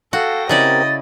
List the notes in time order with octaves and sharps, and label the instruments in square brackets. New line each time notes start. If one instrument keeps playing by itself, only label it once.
[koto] F#4 [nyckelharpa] A4 [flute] F5 [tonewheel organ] G5 A#6
[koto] C#3 E4 D5 [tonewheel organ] C4 G4 A#4 [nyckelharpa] D#5 [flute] A6